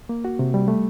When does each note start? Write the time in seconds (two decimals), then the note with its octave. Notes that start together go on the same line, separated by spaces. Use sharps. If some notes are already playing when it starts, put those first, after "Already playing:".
0.09 A#3
0.25 F#4
0.39 C3
0.54 G3
0.68 A3